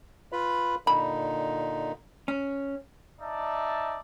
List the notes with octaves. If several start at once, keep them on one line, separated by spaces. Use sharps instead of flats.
F4 B4 B5
A#2 D3 D#4 B5
C#4
D#4 D5 E5 A5